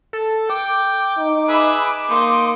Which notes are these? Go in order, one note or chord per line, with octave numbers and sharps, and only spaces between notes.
A4
G5 D6
D#4
G#4 B4 E5 B5
A#3 D#4 C6